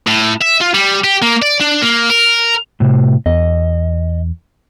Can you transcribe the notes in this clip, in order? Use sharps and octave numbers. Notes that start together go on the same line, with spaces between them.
A2
E5
F4
G3
G4
A#3
D5
D4
A#3
A#4
A2 C3
E2 D#5